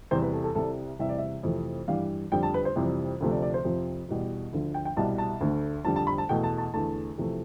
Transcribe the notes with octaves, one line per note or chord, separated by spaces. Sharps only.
E2 C3 G3 C5
B4
A4
A4
C2 C3 G3 A4
E2 C3 E3 G3 E5
D5
E5
F2 C3 E3 A3
G2 E3 G3 F5
F2 D3 G3 G5
A5
B4
C5
F2 C3 E3 G3
D2 C3 F3 A3
D5
D5
C5
F2 C3 F3
E2 B2 G3
D2 D3 F3
G5
G5
C2 B2 G3 A5
A5
D2 D3 A3
F2 D3 G3 A5
A5
B5
A5
E2 B2 A3 G5
A5
A5
E2 D3 A3 A5
E2 C3 F3 A3